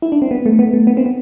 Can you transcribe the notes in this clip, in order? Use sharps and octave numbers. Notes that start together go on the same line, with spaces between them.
E4
D4
C4
B3
A3
B3
A3
B3
C4
B3